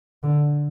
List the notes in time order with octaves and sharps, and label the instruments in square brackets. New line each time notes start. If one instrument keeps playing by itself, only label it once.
[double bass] D3